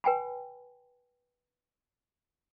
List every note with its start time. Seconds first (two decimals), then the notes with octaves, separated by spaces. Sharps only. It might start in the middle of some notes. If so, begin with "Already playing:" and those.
0.04 B4 G5 G#5 B5